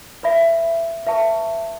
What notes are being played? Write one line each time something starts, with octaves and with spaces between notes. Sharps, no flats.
B4 E5 B5
B4 E5 A5 C#6